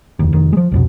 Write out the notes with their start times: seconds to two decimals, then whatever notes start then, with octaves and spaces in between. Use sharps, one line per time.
0.19 F1 D#2
0.33 F1 D#3
0.53 F3 G#3
0.72 C2 F2 B2